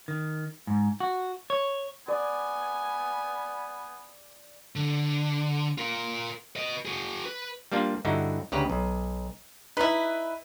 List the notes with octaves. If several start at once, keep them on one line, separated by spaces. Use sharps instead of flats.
D#3
G#2
F#4
C#5
B3 D5 G#5
D3
F4 A#4
B4 D#5
F#4 G#4
B4
G3 A#3 D4 F4
G2 D3 D#4 E4 F#4
D2 C#3 G4 B4 A#5
B1
D#4 E4 B4